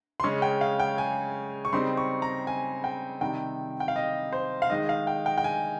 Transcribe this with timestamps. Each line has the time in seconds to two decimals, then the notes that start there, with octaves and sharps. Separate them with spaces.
0.20 C6
0.23 C#3 G#3 C#4 C#6
0.42 G5
0.61 F5
0.80 G5
0.98 G#5
1.65 C#6
1.73 C#3 G3 C4 D#4 C6
1.97 C#6
2.22 A#5
2.47 G#5
2.84 G5
3.21 C3 D#3 G3 G5
3.80 G5
3.88 F5
3.96 D#5
4.32 C5
4.62 F5
4.70 D#3 G#3 D#4 D#5
4.89 F5
5.07 G5
5.26 G5
5.38 G5
5.44 G#5